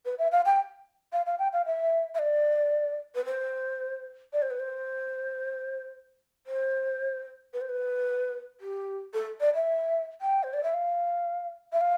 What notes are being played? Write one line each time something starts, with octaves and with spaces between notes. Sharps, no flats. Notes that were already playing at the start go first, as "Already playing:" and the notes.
B4
E5
F5
G5
F5
F5
G5
F5
E5
E5
D5
B4
C5
D5
C5
B4
C5
C5
B4
C5
B4
G4
A4
D5
E5
G5
C5
D5
E5
F5
E5
F5